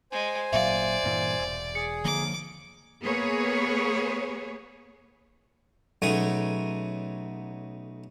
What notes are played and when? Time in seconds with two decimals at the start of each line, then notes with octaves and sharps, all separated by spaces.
0.12 G#3 C5 G#5
0.53 G#1 A#2 F#3 D5 E5 F5
1.04 G2 A#2 E3
1.39 E1
1.75 G#4 C#7
2.05 D3 F3 A#3 D6
3.02 A#3 B3 G#4 B4 C#5
6.02 B1 C#3 F#3 A3 C#5 G#5